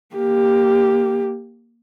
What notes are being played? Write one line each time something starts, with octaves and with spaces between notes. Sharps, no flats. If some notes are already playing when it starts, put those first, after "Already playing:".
A#3 G4